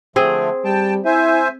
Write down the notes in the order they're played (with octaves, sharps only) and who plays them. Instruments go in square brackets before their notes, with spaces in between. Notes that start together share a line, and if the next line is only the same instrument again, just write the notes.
[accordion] D3 F3 A3 [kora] C4 G#4
[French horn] G3 [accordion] G5 A5
[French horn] E4 [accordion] C5 E5 G#5